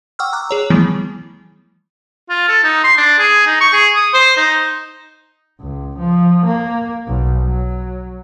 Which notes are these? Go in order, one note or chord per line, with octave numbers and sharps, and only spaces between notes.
F#5 G5 C#6 D6 E6 F6
A#5 D6 E6 F#6
G#4 C#5 A#5
E3 F3 G3 A3 B3 E4
F4
A4
D#4
C6
D4
G#4
D#4
C#6
G#4
D#6
C5
D#4
C#2
F3
A#3
B1
F#3